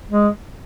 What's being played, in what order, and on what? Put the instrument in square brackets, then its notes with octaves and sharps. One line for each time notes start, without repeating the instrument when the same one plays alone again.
[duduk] G#3